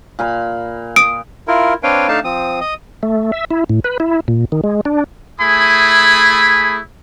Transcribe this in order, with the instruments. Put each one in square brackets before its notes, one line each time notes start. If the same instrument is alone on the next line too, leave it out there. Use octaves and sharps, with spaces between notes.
[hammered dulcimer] A#2 F5 B5
[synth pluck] D#6 [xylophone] D7
[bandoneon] E4 F4 A#4
C4 D4 B4 C#5 F5 G5
A3 D4 D#4 F5 A5
F3 C4 D#6
D#5 D#6
[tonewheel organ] A3
E5
E4
A2
B4
E4
A#2
D#3
G#3
D4
[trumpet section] A3 E4 G#4 G#5 B5 D#6